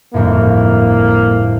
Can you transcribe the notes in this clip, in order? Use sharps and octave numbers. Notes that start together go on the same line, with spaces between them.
G1 F2 A2 A#3